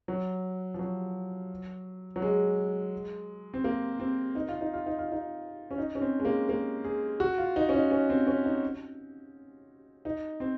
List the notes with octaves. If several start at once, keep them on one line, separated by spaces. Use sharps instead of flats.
F#3
F3
F#3
F#3
G#3
C4
A#3
C4
D#4
F4
D#4
F4
D#4
F4
D#4
C#4
D#4
C#4
C4
G#3
A#3
A#3
G#4
F#4
F4
D#4
C#4
D#4
C#4
C4
C#4
D#4
D#4
C4